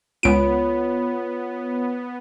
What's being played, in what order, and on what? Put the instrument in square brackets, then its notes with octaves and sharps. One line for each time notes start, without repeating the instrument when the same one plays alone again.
[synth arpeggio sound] C#2 D7 [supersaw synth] B3 [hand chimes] F4 C#5 B5